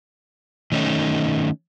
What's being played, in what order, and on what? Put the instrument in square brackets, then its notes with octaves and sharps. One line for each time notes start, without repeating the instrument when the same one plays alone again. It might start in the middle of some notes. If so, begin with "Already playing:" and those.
[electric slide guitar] D#3 A3 C#4 D#4